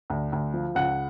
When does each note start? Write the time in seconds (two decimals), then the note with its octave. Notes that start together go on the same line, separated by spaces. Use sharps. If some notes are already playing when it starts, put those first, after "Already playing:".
0.10 D2
0.32 D2
0.54 F3
0.75 C#2 F#5